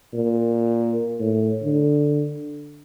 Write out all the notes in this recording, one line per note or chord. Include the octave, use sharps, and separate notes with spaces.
A#2
A2
D3